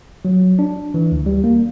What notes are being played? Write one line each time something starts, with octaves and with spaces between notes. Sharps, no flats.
F#3
D4
E3
D2
G3
A#3